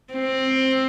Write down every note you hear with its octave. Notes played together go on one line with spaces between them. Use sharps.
C4